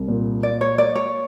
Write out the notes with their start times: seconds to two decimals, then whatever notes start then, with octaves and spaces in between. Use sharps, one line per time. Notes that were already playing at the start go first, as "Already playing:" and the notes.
Already playing: C2
0.08 A#2
0.43 A#3 D5
0.61 C#5
0.78 A#3 D5
0.95 C#5